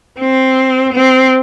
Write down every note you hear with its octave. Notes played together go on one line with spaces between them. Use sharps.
C4
C4